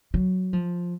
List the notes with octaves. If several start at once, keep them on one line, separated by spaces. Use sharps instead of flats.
F#3
F3